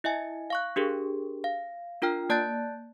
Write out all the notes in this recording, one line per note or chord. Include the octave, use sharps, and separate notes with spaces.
E4 D#5 E5 G#5
F5 C#6 F#6
D4 G4 G#4 A#4
F5
D4 F4 A#4 G5 F6
A#3 D5 A5 F#6 G6 A6